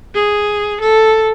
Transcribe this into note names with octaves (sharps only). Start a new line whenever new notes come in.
G#4
A4